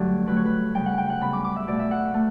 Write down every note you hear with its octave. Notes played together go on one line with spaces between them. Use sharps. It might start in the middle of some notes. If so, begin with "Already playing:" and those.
Already playing: G2 D3 F#3 A3 D5
G2 D3 F#3 A3 B4
C#5
B4
C#3 G3 B3 G5
F#5
G5
F#5
C#3 G3 B3 B5
D6
D6
E5
B2 A3 D5
E5
F#5
A3